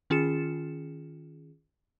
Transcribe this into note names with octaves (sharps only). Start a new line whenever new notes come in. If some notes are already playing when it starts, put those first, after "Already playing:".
D#3 C#4 F4 G#4 C#7 E7